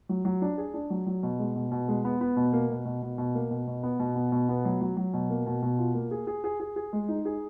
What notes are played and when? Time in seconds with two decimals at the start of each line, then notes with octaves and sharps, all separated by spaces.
0.09 F#3
0.25 F#3
0.42 D4
0.58 G#4
0.74 D4
0.90 F#3
1.06 F#3
1.23 B2
1.39 G#3
1.56 B2
1.72 B2
1.88 G#3
2.05 B3
2.21 B3
2.37 B2
2.53 A#3
2.70 B2
2.85 B2
3.03 B2
3.18 B2
3.35 A#3
3.51 B2
3.67 B2
3.83 B3
4.00 B2
4.15 B3
4.32 B2
4.49 B3
4.65 F#3
4.81 F#3
4.97 F#3
5.14 B2
5.30 A#3
5.46 B2
5.62 B2
5.78 F4
5.95 A#3
6.11 G#4
6.27 G#4
6.44 G#4
6.60 G#4
6.76 G#4
6.93 G#3
7.08 D#4
7.25 G#4